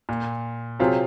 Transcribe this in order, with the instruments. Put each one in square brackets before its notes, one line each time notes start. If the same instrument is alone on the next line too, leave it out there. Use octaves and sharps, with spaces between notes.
[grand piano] A#2
[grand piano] C3 [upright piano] F#3 C4 F4 G#4